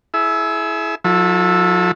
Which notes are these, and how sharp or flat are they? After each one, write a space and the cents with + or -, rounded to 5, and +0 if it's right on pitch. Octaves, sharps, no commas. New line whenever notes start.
E4 +0 G#4 +35 E5 +0
F#3 -45 E4 +0 A4 +0